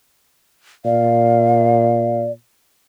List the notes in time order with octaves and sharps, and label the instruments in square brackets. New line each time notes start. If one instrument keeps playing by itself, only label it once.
[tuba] A#2 [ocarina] D5 [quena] F5